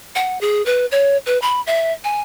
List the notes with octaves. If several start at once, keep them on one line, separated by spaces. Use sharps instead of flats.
F#5
G#4
B4
C#5
B4
B5
E5
G#5